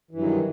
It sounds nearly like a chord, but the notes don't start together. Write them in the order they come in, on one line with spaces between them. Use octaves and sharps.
E3 G2 F#3 D#3